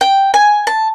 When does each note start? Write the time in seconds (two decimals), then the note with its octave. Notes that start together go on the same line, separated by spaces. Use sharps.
0.01 G5
0.34 G#5
0.67 A5